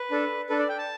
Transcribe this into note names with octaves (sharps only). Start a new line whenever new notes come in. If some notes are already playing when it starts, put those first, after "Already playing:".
Already playing: B4
D4 A4
D4 A4 B4
D5
G5
A5